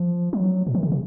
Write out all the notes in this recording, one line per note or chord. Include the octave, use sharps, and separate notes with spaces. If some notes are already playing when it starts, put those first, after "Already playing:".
Already playing: F3
F#3
A#2
D#3
C#3
C3